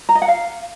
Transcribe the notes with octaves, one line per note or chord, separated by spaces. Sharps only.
A#5
D#5
F#5
F5